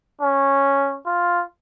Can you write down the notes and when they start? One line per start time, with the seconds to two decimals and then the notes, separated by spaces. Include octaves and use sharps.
0.21 C#4
1.06 F4